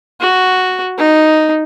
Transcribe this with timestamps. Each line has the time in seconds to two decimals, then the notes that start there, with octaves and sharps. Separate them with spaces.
0.20 F#4
0.98 D#4